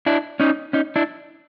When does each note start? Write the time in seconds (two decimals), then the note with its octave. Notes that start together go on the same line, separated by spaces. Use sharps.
0.06 D4 E4
0.40 C#4 D#4
0.73 C#4 D#4
0.96 D4 E4